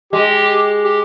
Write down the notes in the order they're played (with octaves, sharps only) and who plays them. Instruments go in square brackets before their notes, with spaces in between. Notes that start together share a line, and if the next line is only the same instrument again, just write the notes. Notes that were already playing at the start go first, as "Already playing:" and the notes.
[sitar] G#3 [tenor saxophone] G4
[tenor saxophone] G4